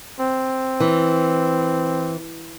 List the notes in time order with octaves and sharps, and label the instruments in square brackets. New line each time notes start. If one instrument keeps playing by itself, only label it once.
[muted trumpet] C4
[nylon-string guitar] E3